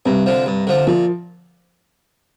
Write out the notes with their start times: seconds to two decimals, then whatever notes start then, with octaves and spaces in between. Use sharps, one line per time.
0.06 G2 C3
0.26 D3 F3
0.46 G2
0.67 D3 F3
0.87 A#2 F3